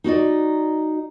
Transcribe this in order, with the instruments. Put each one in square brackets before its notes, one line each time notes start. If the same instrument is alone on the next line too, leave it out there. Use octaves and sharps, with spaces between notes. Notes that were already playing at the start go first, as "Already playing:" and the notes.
[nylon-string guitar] D#4 F#4 D5 D#5